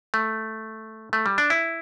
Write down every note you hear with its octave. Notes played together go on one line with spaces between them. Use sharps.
A3
A3
G3
D4
E4